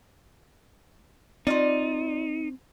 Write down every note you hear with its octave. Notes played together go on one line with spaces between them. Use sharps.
C4 D#4 F4 D5